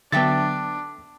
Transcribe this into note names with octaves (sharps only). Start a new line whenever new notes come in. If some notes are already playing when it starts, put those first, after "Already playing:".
D3 F#3 B3 D4 A4 E5 G5 A6